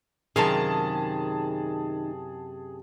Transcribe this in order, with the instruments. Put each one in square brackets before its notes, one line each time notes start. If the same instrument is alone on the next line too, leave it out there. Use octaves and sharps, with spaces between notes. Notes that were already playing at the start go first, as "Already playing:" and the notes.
[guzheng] F#2 C3 F5 [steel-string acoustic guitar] D#3 [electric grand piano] G#4 A5